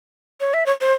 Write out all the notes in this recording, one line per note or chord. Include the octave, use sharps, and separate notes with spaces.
C#5
E5
C#5
C5